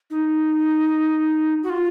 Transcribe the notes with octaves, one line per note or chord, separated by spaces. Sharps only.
D#4
F#4
F4